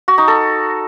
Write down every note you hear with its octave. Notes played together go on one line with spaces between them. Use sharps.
F#4
D#4
A4